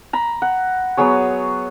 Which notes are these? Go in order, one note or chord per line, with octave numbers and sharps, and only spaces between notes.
A#5 B5
F#5
F#3 B3 G#4 C#5